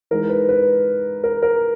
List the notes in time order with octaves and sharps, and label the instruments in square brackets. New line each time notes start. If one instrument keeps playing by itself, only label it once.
[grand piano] E3 G#3 D#4 A#4
B4
B4
A#4
A#4